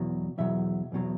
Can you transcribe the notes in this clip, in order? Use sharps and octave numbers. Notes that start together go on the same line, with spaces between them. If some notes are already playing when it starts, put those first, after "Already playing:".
Already playing: E2 B2 F#3
E2 B2 F#3 E5
E2 B2 F#3